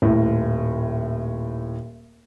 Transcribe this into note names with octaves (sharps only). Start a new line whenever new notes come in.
D#1 A2